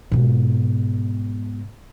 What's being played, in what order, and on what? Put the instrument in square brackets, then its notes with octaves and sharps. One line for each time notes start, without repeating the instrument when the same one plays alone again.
[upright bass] G#2 B2